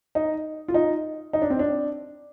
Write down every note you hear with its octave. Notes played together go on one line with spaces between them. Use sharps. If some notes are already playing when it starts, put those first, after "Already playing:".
D#4
F4
D#4
D#4
D4
C4
D4